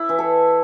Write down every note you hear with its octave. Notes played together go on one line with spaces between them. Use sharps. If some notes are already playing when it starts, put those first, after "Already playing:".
Already playing: E4
E3
A4